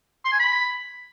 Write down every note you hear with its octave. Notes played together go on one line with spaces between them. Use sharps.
C6
G#5
B5